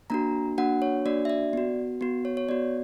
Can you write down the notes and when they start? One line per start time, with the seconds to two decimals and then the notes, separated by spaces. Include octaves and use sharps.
0.10 A#3 D4 F#4 A#5
0.58 A#3 D4 F#4 F#5
0.82 C#5
1.06 A#3 D4 F#4 D5
1.25 E5
1.30 D5
1.53 B3 F#4
2.01 B3 F#4
2.25 C#5
2.37 C#5
2.49 B3 F#4 D5